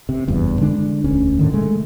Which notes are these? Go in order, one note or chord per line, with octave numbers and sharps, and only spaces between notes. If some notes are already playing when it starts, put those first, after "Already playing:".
C3
F#1 E2 G2
D3 G#3 D4
E1 D2 C#4
A2 D3 D#3
C3 D#3 G#3 A3